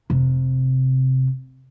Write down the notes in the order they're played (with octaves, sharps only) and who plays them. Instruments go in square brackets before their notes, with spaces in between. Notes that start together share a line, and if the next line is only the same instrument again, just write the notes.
[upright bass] F1 C3